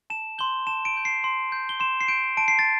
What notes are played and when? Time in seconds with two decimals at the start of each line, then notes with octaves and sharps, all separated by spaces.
0.10 A5 E7
0.38 C6 G6 G7
0.67 A5 E7
0.85 D7
0.96 C6 G6
1.05 C7
1.24 C6
1.52 G6
1.69 G7
1.80 C6 E7
2.01 C7
2.08 G6 D7
2.37 A5 D7
2.48 C7
2.59 A6